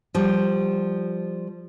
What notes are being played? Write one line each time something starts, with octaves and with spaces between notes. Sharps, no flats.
F3 G3